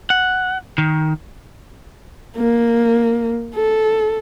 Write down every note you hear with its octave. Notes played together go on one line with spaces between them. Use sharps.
F#5
D#3
A#3
A4